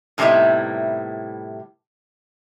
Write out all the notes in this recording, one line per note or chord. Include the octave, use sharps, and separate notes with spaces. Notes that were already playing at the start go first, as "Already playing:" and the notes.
A2 C3 G3 B3 D#4 E4